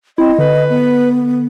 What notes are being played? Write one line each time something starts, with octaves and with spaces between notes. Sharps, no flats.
C4 E4 D#5
D3 B4
B3